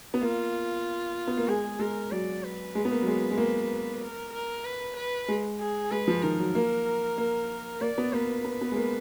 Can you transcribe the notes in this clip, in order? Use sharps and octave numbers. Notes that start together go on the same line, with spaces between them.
B3
A#3 F4
B3
A#3
G#3 G#4
G#3 A#4
F#3 D5
B4
G#3
B3
A#3
F#3
G#3
G#3
A#3
A#4
A#4
B4
B4
G#3
G#4
G#3 B4
F3
D#3 A#4
F#3
A#3
A#3
A#3 D5
B3
A#3 B4
B3
B3
G#3
A#3